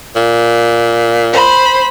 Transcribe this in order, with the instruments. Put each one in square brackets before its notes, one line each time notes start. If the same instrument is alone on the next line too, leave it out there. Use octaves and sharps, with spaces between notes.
[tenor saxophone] A#2
[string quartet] C5 B5